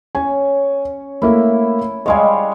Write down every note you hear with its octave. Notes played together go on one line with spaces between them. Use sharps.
C#4 G#5
A3 A#3 E4 E5
G3 G#3 C#5 D#5 F5 G#5